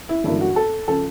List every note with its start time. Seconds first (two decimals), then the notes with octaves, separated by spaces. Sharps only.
0.09 E4
0.24 A1 G2 D3 F#3 A#3 E4
0.41 F#4
0.56 A4
0.88 C#3 F3 A4